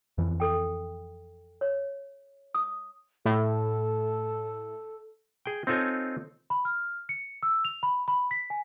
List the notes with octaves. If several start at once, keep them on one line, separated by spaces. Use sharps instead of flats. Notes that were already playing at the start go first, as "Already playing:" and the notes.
F2 E3
A4 G5
C#5
D#6
A2 A4
G#4 G5
C4 D#4 F4 A4 C#5 G#5
B5
F6
C#7
E6
F7
B5
B5
B6
G#5